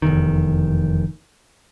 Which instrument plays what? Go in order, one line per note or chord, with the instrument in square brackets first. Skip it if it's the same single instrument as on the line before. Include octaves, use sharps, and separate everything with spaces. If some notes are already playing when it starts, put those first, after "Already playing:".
[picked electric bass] F1 E2 D#3